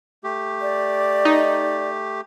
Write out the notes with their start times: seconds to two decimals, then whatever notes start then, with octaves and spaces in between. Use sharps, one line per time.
0.24 A3 G4
0.61 D5
1.25 D#4